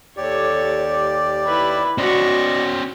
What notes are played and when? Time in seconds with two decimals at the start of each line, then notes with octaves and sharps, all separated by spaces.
0.17 D#2 G4 A4 C#5 D5
1.45 E4 B4
1.98 C#4 F#4 C5 D5 D#5 C#6